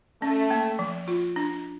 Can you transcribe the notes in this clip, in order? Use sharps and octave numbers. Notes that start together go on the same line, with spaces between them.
A3 C#4
A#3
F3
F4
D4